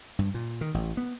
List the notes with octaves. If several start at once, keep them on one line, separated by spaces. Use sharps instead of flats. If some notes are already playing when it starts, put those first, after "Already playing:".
G2
A#2
D#3
A1
B3